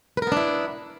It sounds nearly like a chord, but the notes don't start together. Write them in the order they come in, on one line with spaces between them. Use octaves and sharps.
B4 A#4 B3 D4 E4